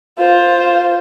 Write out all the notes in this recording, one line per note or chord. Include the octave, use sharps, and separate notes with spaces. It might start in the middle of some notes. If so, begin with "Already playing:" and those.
F4 C5